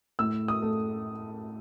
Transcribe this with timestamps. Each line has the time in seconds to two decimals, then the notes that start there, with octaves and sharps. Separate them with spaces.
0.19 A2 E6
0.48 D#6
0.62 A3